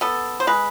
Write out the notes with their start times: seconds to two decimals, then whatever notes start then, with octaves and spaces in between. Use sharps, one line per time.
0.01 B3 A4
0.40 C5
0.47 G#3 B4